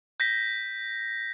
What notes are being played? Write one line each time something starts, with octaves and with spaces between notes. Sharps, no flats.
G6 A#6 B6